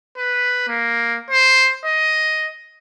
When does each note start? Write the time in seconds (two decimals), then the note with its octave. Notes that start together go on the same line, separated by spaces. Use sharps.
0.17 B4
0.68 A#3
1.30 C5
1.85 D#5